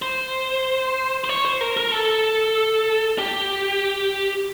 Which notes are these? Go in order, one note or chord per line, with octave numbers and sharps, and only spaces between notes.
C5
C5
C#5
C5
A#4
A#4
A4
G4